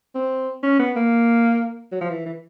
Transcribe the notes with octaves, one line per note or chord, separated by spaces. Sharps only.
C4
C#4
B3
A#3
F#3
F3
E3
E3